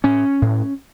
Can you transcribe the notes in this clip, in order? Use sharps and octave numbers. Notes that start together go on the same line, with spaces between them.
A2 C#4
A2